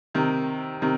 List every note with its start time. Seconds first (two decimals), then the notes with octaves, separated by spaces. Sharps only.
0.15 C3 D#3
0.82 C3 D#3